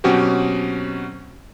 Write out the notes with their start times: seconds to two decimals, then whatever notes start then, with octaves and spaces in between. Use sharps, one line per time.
0.04 B2 F#3 C4 C#4 F#4 G4